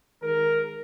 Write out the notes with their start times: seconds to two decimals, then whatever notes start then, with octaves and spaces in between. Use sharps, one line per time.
0.22 D#3 G#3 A#4